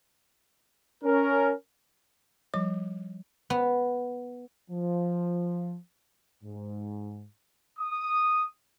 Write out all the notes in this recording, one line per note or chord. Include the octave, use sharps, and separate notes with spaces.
C#4 A#4
F3 G3 D6
B3
F3
G#2
D#6